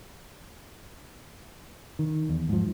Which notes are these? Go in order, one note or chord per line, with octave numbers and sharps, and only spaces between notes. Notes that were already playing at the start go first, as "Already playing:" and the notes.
D#3
E2
G#2 F3